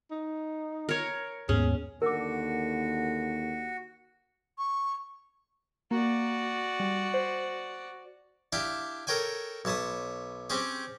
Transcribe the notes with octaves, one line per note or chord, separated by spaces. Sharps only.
D#4
A#4 C#5
D#2 G#2 B3 C#4 G#4
D#2 D3 F#4 A#4 D6
C#6
A#3 F#4 D5
G3
C5
D4 E4 G4 F5
A4 A#4 C#5 G5 G#5
B1 C#5 A5 B5 D#6
C4 C#4 G4 G#4